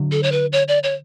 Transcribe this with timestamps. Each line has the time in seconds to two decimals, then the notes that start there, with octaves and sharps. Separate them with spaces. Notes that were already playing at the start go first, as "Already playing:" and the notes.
Already playing: D3 F#3
0.12 A4
0.23 C#5
0.32 B4
0.52 C#5
0.68 D5
0.83 C#5